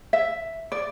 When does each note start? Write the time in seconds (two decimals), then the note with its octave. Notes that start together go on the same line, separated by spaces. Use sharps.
0.13 E5
0.72 D5